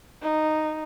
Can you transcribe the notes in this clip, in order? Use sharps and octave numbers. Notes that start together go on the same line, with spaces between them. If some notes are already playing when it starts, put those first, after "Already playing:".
D#4